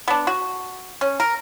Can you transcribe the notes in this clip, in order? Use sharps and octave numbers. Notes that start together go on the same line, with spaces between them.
B3 D4
F#4
C#4
A#4